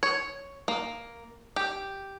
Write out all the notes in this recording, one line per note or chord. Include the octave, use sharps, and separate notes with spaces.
C#5
A#3
G4